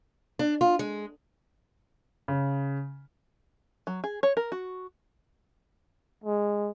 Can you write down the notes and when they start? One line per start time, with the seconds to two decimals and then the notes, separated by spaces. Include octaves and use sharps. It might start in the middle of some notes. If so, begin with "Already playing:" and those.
0.39 D4
0.61 F4
0.79 G#3
2.28 C#3
3.87 F#3
4.04 G#4
4.23 C#5
4.37 A#4
4.52 F#4
6.24 G#3